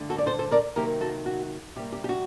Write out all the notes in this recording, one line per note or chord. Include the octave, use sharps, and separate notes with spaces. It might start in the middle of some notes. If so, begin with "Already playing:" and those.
Already playing: G2 D3 A3
F#4 A4
D5
A4 C5
A4 C5
A#4 D5
C3 D#3 F#3 A#3 D#4 G4 A#4
F#4 A4
F#4
C3 G3 A#3 G4
G4
G4
F#4